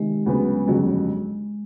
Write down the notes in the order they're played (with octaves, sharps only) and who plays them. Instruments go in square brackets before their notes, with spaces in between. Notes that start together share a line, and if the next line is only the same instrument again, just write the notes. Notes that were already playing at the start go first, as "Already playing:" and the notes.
Already playing: [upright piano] C3 D#3 [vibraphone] G#3
[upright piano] D2 C#3 F#3 B3
G1 F2 C#3 F#3